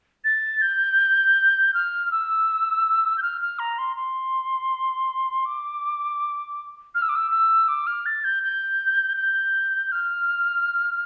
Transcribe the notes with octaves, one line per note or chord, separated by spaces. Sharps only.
A6
G6
F6
E6
G6
F6
F6
A#5
C6
C6
D6
F6
E6
D6
E6
E6
D6
F6
A6
G6
G6
G6
F6